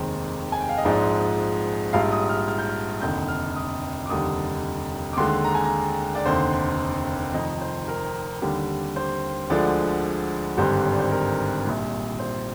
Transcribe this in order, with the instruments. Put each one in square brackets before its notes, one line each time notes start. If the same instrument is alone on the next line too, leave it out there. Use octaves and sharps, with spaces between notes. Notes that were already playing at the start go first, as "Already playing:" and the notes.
Already playing: [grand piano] F1 D#2 D#3 G#3 C5
G#5
G5
F5
D#5
A#1 G#2 F3 G#3 D5
A#1 G#2 G3 F5
D#6
F6
F6
G6
F6
F1 D#2 D3 G6
F6
D#6
D6
F1 D#2 D3 G3 D#6
D6
D#2 D3 G#3 C6
A#5
G#5
A#5
D5
F1 D#2 D3 C5
F1 F2 D#3 D#5
C5
A#4
D#2 D3 G3
C5
D2 D3 F3 G#3 D5
G#1 G2 D3 G3 C5
C5
D5
C5
A#4
A#1 A#2 G3
C5